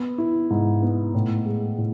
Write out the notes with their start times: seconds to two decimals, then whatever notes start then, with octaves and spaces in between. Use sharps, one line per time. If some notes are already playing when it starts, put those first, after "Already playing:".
Already playing: B3
0.18 E4
0.50 G#2
0.82 B3
1.14 A2
1.46 G#3
1.78 A2